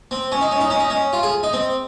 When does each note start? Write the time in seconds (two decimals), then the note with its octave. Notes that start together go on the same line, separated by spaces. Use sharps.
0.11 C4
0.32 C#4
0.41 D#4
0.51 C#4
0.60 D#4
0.70 C#4
0.80 D#4
0.90 C#4
1.13 F4
1.23 G#4
1.43 D#4
1.53 C4